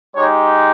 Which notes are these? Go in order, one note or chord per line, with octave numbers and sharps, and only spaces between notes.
G#3 D#4 G4 C#5